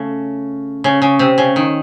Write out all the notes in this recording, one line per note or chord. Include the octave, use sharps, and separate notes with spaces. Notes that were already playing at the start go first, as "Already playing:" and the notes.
Already playing: C#3 A3
C#3
C#3
C3
C#3
D#3